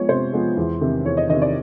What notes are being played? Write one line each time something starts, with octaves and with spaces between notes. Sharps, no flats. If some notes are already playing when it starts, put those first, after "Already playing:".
Already playing: F3 G#3 B3 C#5
C3 C5
F3 G#3 B3
E2
C3 D#3
E2 C#5
D#5
C3 D#3 D#5
D5